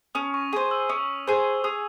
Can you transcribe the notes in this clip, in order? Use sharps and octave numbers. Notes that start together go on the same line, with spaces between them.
C#4 D#6
C#6
G#4 C5 D#6
E6
C#4 D#6
G#4 C5
G#4 D#6